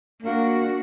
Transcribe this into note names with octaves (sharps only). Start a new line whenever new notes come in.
A#3 D4 F#4